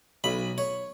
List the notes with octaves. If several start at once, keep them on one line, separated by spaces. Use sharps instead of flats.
B1 B5
C#5